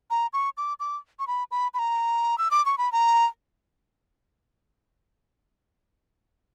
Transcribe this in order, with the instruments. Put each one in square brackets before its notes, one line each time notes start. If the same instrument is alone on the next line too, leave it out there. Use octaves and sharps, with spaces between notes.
[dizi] A#5
C#6
D6
D6
C#6
B5
B5
B5
A#5
E6
D6
C#6
B5
A#5